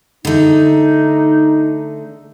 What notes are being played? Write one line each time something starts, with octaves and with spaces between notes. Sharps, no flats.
D3 A3 D#4